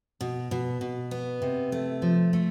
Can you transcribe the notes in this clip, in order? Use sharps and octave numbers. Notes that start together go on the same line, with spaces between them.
B2
B2
B2
B3
C3
A3
F3
A3